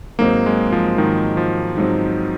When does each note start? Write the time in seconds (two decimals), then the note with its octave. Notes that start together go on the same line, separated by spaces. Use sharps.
0.19 G#2 F#3 A#3 C4 D#4
0.46 G#3
0.72 F3
0.98 G#2 D#3 F#3 C4 D#4
1.37 F3
1.77 G#2 F#3 C4 D#4